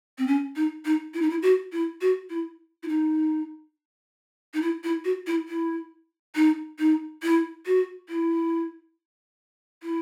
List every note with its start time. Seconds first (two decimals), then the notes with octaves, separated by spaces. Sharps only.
0.18 C4
0.27 C#4
0.56 D#4
0.85 D#4
1.14 E4
1.21 D#4
1.30 E4
1.42 F#4
1.72 E4
2.01 F#4
2.30 E4
2.83 E4
2.88 D#4
4.54 D#4
4.62 E4
4.84 E4
5.05 F#4
5.27 E4
5.48 E4
6.35 D#4
6.79 D#4
7.23 E4
7.66 F#4
8.09 E4
9.83 E4